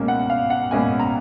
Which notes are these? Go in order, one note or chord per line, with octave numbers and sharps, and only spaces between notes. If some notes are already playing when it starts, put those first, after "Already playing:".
Already playing: C#2 B2 A#3 C#4
F#5
F5
F#5
C#2 B2 A#3 C#4 G#5
A#5